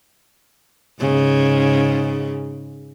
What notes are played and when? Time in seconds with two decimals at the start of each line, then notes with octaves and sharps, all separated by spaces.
1.00 G#2 C#3